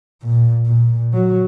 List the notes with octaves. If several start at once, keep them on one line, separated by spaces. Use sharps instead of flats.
A#2
A#2
F#3